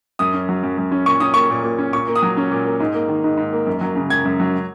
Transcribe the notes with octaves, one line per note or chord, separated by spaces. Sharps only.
F#2 D#6
C#4
F#3
F#2
F#2
C#4
A#2 C#6
C#4 D#6
A#3 C#6
A#2
A#2
C#4
A#2 C#6
A#3
D#6
F#3
C#4
A#2
A#3
G#2
A#3
D#3
G#2
G#2
A#3
F#2
F#3
C#3
F#2 G#6
F#2
F#3